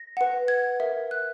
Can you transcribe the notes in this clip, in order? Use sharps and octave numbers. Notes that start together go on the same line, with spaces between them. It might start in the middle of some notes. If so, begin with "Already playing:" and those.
Already playing: A#6
B4 F#5
G#6
A#4 E5
F#6